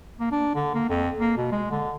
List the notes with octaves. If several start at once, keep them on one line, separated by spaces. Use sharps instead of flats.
A#3
D4
D3
A#3
F2
A#3
B2
G#3
D3